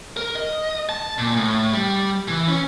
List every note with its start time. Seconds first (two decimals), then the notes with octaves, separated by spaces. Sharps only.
0.17 A#4
0.35 D#5
0.89 A5
1.18 A#2
1.36 A2
1.73 G3
2.28 E3
2.48 C#4